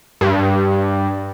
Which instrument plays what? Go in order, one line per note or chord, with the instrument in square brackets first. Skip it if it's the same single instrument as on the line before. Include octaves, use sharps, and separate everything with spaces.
[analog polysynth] G2